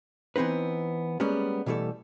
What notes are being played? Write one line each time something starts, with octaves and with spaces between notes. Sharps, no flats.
E3 B3 C4 D#4 B4
G3 G#3 A#3 B3 C#4
B2 E3 G3 A3 A4